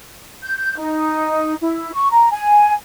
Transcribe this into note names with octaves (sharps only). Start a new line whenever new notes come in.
G6
D#4
E4
C#6
A#5
G#5